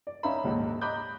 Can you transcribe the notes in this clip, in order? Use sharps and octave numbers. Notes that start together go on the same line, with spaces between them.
D5
C#4 D#4 E5 F5 A#5 B5
D#1 A#1 G#2
D#5 A#5 B5 D6 F#6 G6